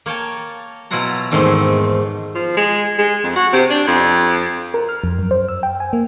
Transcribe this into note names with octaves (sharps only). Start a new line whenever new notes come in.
A#3 C#5 G5 A5
B2 F#3 E4 F4 F#5 A#5
E2 G#2 D#3 A3 C4
F3
G#3
G#3
F2
F#4
C3
D4
F2
A#4
F6
F2
F#2
C5
E6
G5
G#5
A#3